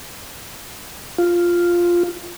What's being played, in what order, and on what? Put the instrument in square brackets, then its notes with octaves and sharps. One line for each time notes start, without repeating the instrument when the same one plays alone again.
[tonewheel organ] F4